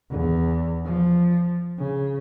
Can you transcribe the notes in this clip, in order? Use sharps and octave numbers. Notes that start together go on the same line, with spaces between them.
E2
F3
C#3